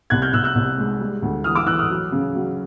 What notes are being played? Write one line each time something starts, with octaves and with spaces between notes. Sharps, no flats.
C2 F#6 G#6
F6 G6
C2 E6 F#6
E6 F#6
C2
G#3
G3
D2
E3 D#6 F6
D6 E6
E3 E6 F#6
D#6 F6
F#3
C#3
F#3